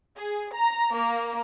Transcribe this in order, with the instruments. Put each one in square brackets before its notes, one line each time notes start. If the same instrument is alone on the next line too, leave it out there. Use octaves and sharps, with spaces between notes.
[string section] G#4
A#5
A#3